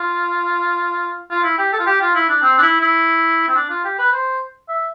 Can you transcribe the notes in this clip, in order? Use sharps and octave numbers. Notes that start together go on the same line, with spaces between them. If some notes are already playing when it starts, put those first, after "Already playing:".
Already playing: F4
F4
E4
G4
A4
F4
G4
F4
E4
D4
C4
D4
E4
E4
C4
D4
F4
G4
B4
C5
E5